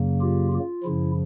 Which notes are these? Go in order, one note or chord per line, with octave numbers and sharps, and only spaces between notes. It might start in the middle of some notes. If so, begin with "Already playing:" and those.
Already playing: F#2 C#3 F#3 A#3
F4 G4
F4
F#2 C#3 F3 E4